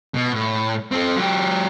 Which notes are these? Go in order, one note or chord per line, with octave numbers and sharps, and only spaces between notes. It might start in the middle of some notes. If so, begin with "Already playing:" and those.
B2
A2
C4 A4
F#3 G4